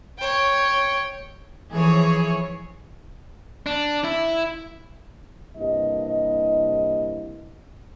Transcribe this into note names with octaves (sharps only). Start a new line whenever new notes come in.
C#5 G5
E3 F3 G#4 C#5
D4
E4
G2 C3 A#3 E4 D#5